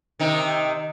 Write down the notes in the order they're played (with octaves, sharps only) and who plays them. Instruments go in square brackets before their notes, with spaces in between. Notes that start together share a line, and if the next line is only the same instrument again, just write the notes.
[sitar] C3 D#3 D#4